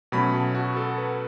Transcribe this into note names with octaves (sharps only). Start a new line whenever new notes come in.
B2 F#3 A3 C#4 B5
A5
F#4
A4
B4